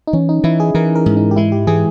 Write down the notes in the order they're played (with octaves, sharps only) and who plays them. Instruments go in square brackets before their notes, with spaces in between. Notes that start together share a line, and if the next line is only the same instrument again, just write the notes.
[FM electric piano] D#4
[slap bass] E3 [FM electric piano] C#4
[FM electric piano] D#4
[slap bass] E3 [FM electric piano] E4
[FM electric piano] G#4
[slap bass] E3 [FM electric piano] A#4
[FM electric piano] A#4
[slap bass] G#2
[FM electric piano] D#4
G4
[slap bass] G#3 [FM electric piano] E4
[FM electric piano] G4
[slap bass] E3 [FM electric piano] G#4